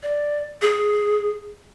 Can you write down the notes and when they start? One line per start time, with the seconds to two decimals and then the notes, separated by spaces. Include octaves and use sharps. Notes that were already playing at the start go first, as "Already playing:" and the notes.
0.03 D5
0.62 G#4